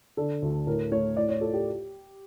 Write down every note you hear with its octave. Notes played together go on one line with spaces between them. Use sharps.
D3 A4
D2
A2 A#4
A3 C#5
A2 D5
C#5
F4 A4
G4